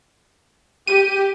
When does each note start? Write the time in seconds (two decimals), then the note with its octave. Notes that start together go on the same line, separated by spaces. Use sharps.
0.87 G4 D#7